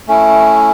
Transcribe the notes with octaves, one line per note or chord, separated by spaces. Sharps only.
A3 C#4 E4